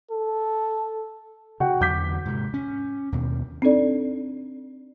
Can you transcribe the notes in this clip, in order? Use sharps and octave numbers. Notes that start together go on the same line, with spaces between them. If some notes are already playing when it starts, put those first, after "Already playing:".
A4
C#3 F#4 F#5 G5
E2 D3 F#3 D6 G6 B6
G#2 C3
C#4
D#2 B2
C4 D4 D#4 A4 D5